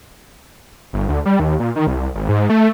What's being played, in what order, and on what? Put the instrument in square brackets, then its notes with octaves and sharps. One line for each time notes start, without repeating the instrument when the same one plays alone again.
[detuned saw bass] G1
D2
G3
D#2
A#2
D#3
C2
G#1
G#2
A3